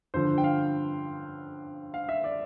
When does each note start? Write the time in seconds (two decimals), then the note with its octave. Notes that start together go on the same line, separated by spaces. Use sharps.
0.14 G2 D3 F3 C5
0.38 G5
0.44 F5
1.94 F5
2.09 E5
2.24 D5